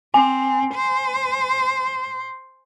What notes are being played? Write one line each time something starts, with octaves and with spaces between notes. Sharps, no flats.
C4 G#5
C5